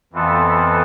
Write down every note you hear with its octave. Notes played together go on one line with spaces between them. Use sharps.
F2 E3 B3 F4 A4